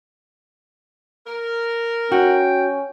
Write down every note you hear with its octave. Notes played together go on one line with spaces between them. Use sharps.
A#4
C#4 F#4 G5